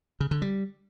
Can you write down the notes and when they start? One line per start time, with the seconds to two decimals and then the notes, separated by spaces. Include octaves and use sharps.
0.20 C#3
0.31 D3
0.42 G3